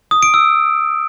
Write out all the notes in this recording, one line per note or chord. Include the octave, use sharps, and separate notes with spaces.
D#6
D7
E6